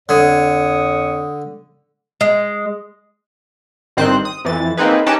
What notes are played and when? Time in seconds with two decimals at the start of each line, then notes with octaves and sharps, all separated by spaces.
0.09 F2 D3 C#5 D#6
2.21 G#3
3.97 G#1 G2 D#3 C4 C5 F#6
4.25 D#6
4.45 F2 E3 A6
4.77 A#3 C4 D#4 G#4 B4
5.06 C#4 D#4 G4 B4 G5 A5